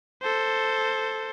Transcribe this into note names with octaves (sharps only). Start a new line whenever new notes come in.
A4 C5